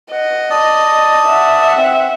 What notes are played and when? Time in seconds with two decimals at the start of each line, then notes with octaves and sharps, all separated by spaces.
0.12 D#5 F#5
0.50 D5 A5 D#6
1.28 E5 F#5
1.77 C4